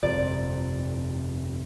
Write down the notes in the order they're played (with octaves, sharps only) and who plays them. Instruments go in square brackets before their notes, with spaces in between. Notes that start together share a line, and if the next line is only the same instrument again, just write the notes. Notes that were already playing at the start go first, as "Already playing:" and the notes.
[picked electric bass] G1 F2 C3 [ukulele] D5